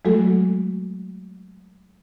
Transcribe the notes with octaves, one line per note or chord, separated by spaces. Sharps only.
F#3 G#3 A3 F#4 A4